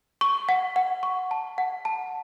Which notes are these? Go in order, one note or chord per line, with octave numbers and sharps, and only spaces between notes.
C#6
F#5
F#5
C#6
A5
F#5
A5